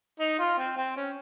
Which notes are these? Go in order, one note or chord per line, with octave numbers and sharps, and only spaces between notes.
D#4
F4
C4
C4
C#4